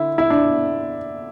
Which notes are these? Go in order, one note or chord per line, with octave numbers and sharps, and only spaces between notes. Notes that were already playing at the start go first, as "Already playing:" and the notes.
Already playing: D3 E4
E4
D4